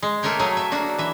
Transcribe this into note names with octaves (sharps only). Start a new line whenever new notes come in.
G#3
A3 A#3 A#4 C#5 G5
F#3 A3 G#4
E5
A#3 D4 F#4
E3 E5